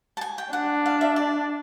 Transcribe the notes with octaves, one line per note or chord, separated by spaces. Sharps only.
A5
G#5
G5
D4 F#5
F5
E5
D5